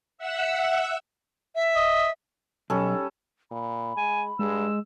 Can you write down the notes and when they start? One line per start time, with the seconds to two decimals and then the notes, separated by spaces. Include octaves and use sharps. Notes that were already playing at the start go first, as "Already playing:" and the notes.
0.18 E5 F#5 E6
1.55 E5
1.75 D#5
2.70 B1 G3 C#4 A4
3.51 A#2 B5
3.97 G#3 G#5
4.39 G2 G#3 E6